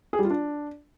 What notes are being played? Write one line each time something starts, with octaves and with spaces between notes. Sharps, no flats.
G#4
G3
F4
D4